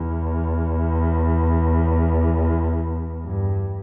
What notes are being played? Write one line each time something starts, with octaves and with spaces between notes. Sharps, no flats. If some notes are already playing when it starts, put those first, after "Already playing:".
Already playing: E2
G2